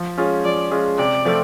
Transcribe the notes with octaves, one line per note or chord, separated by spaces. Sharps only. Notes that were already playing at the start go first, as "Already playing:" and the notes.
Already playing: F3
G#3 C#4 F4 G#4
F3 D5
G#3 C#4 F4 G#4
C3 D5
F3 A3 C4 F4